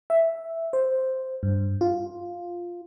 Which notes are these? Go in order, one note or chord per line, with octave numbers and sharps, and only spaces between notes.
E5
C5
G2
F4